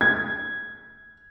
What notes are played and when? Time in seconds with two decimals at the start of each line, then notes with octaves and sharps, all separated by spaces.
0.01 G#6